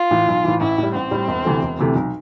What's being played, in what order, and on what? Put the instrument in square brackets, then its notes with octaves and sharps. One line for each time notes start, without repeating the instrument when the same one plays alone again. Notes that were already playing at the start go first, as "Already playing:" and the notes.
Already playing: [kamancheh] F4
[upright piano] A2 E3
B1
A2 E3
[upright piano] A1 [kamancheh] E4
[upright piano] A2 G3
[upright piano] A1 [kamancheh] C4
[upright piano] A2 G3
E1
D2 C3 E3 A3
E1
D2 C3 E3 A3
B1